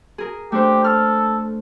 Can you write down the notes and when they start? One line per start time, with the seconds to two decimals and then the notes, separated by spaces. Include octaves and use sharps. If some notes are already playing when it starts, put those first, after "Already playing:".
0.18 G#4 A#4
0.52 A3 D4 G4 C5
0.84 A4 F6